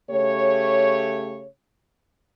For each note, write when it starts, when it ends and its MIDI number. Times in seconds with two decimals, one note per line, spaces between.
0.10 1.45 49
0.10 1.45 57
0.10 1.45 67
0.10 1.45 73